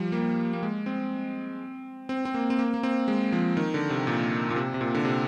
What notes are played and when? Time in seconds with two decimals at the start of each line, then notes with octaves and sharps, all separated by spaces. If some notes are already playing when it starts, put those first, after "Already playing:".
Already playing: F3 G3
0.12 A#3
0.53 A#3
0.63 G#3
0.86 C4
2.09 C4
2.25 C4
2.34 A#3
2.50 C4
2.59 A#3
2.74 A#3
2.83 C4
3.08 G#3
3.33 F3
3.57 D#3
3.74 D3
3.90 C3
4.07 A#2
4.50 A#2
4.56 C3
4.74 C3
4.81 A#2
4.95 D3
5.05 C3